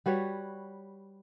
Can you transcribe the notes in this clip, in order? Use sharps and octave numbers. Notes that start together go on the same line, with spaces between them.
G3 F#4 B4 C#5